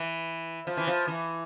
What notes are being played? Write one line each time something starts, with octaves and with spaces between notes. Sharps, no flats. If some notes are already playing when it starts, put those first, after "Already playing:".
Already playing: E3
F3
E3
F3
E3